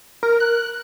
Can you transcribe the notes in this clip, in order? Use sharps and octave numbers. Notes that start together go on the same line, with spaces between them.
A#4
F#6